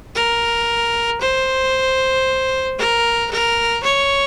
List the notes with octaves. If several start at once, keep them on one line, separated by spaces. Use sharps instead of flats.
A#4
C5
A#4
A#4
C#5